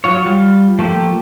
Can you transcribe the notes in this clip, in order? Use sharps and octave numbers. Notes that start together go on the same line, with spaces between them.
F#3 F4 C#5
G3 F4
F3 A3 A#3 G4